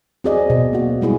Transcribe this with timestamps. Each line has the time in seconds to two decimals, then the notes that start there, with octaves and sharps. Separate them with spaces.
0.24 C4 F#4 G#4 D5 D#5
0.50 B2
0.73 A#3 F#4
1.01 G3 G#3 E4 G#4